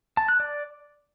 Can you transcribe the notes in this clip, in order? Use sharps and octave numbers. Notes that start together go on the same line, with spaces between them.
A5
F#6
D5